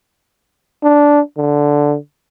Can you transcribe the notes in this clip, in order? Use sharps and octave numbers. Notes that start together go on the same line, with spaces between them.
D4
D3